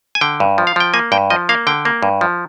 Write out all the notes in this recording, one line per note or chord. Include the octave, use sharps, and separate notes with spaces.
G#5
D3 G5
G2
F3
F5
F3 G5
A#3 G#5
G2 G5
F3 D#5
A#3 F5
D3 G5
A#3
G2
F3